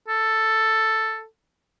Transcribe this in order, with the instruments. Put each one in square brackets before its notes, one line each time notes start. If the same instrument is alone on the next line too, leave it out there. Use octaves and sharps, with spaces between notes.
[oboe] A4